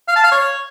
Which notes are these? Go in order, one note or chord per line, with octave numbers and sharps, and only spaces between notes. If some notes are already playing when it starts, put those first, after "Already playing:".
F5
A5
F5
C#5